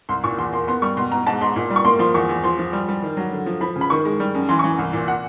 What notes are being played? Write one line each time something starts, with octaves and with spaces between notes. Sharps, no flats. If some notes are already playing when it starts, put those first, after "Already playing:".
C2 C6
A#2 C#6
E2 C6
A#3 C6
B3 C6
G3 C#6
B2 C6
B2 A#5
G#2 A5
G#2 C6
A#2
G3
C#6
A#3 C6
F3 C6
E2 C#6
E2
F3 C6
F3
G3
G3
D#3
F#3
D3
F3
F3 B5
C#3
B5
D#3 C#6
G#3
G3
F#2
E3 C6
C#6
E3
C2
A#2
F#5